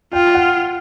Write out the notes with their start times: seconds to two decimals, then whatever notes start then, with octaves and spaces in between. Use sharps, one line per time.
0.13 F4 G5
0.35 F#5